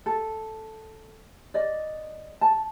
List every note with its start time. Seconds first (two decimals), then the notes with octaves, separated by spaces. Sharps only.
0.06 A4
1.54 D5 D#5
2.41 A5